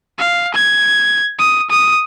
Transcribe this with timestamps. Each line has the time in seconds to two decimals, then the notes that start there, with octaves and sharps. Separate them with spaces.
0.18 F5
0.55 G#6
1.39 D#6
1.70 D#6